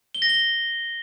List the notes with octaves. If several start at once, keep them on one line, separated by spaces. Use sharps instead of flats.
G7
A#6
G7